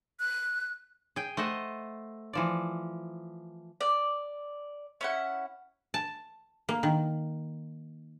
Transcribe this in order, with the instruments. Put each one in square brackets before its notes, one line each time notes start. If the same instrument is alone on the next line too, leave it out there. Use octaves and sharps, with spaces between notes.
[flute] F#6
[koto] G#4 G5
A3 C5 D#5 F#5
E3 F3 D5
[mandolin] D5
C#4 E4 F#5
[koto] A5
A#3
D#3